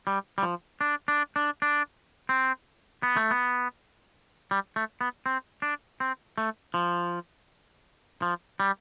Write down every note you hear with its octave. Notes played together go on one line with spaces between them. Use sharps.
G3
G3
F3
D4
D4
D4
D4
C4
B3
A3
B3
G3
A3
B3
C4
D4
C4
A3
F3
F3
G3